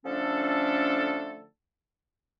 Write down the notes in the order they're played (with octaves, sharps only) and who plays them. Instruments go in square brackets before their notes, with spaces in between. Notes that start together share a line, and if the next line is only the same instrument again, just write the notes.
[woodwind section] D3 F3 A3 C#4 D4 A4